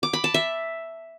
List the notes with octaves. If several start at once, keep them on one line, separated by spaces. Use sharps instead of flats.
D6
B5
A5
E5